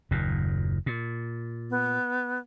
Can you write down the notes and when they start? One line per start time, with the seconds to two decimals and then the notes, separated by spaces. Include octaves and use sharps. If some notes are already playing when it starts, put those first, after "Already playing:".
0.11 F#1 D#2 A#2
0.86 A#2
1.70 B3